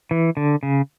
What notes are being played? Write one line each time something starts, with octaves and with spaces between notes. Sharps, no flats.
E3
D3
C#3